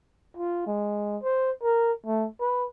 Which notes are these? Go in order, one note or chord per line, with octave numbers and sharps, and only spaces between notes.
F4
G#3
C5
A#4
A3
B4